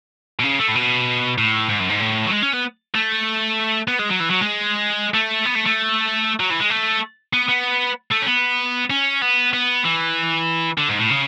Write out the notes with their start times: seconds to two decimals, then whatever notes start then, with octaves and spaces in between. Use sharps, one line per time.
0.39 B2
0.44 C#3
0.59 A3
0.68 A2
0.75 B2
1.38 A2
1.69 G#2
1.80 F#2
1.90 G#2
2.00 A2
2.26 F#3
2.31 G#3
2.42 C#4
2.53 B3
2.94 A3
3.88 B3
3.99 G#3
4.10 F#3
4.20 E3
4.30 F#3
4.41 G#3
5.14 A3
5.46 B3
5.55 A3
5.66 A3
6.40 F#3
6.50 E3
6.60 G#3
6.70 A3
7.33 B3
7.49 B3
8.12 A3
8.23 C#4
8.27 B3
8.90 C#4
9.22 B3
9.53 B3
9.84 E3
10.78 D3
10.89 G#2
10.99 A2
11.10 C#3